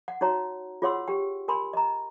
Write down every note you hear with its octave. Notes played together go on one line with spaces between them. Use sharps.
F#5
D#4 F#4 C#5 A#5
F4 G#4 C#5 F#5 C6 E6
G4 G5
A#4 G#5 B5 C6
D#5 A#5